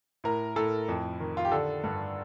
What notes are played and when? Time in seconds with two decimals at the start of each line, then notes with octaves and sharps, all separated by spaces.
0.24 A2 A#4
0.56 A2 A4
0.89 F2
1.20 D#3
1.37 F4
1.45 G4
1.51 D3 A4
1.84 G2